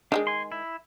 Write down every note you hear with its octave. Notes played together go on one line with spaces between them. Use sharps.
D#3 F#3 G#3 D4
G#5 C6
E4